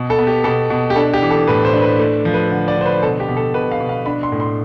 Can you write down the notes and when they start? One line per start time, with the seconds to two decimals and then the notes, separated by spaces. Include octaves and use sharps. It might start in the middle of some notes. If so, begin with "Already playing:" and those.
Already playing: B2
0.10 A4
0.19 B3
0.27 G4
0.44 B2 A4
0.70 B2
0.90 G4
0.96 D4 A4
1.14 G4
1.22 E3
1.30 A4
1.48 A2 B4
1.65 C5
1.74 D4
1.82 B4
1.99 A3
2.25 F3
2.34 B4
2.51 D3
2.68 D5
2.77 D3 C5
2.86 B4
3.03 B2 A4
3.20 G4
3.29 B2
3.37 A4
3.54 B2 B4
3.71 F5
3.80 B2
3.89 F5
4.06 D4 B5
4.23 C6
4.32 A2
4.40 C6